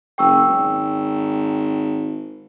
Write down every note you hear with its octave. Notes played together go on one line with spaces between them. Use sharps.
F#1 G5 C#6 E6
G#1